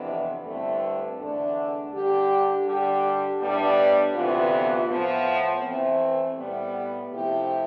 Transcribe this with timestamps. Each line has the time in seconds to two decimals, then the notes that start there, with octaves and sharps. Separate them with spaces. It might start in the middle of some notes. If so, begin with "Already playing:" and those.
Already playing: F2 C3 E3 B3 D4
0.43 G2 D3 A3 C4 E4
1.17 E2 D3 A3 D4
1.92 D3 G3 D4 G4
2.66 D3 G3 D4 G4
3.40 A2 G3 B3 D4
4.14 D2 C3 E3 B3 F4
4.88 A2 F3 B3
5.62 E3 A3 C4
6.36 A2 G3 B3
7.11 C3 F3 A3 E4 G4